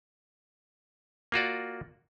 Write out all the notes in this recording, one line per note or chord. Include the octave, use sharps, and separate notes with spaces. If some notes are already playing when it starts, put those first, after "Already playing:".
A#3 F4 F#4 D5